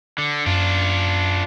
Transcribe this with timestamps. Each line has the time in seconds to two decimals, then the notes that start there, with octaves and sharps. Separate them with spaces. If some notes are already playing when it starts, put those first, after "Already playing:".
0.18 D3
0.46 F#2 D4 F4